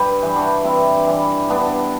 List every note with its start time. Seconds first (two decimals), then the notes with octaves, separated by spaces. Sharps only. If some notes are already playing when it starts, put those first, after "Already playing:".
Already playing: G2 G4 B4
0.22 E3 G3
0.36 D4 F#4
0.64 G2 C4 E4
1.07 E3 G3
1.50 G2 B3 D4